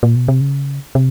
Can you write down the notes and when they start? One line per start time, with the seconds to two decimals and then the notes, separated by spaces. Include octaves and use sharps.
0.03 A#2
0.16 B2
0.28 C3
0.41 C#3
0.95 C3